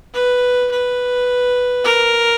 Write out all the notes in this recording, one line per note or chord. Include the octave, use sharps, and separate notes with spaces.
B4
B4
A#4